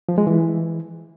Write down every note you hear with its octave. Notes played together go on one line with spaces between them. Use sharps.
F3
G#3
E3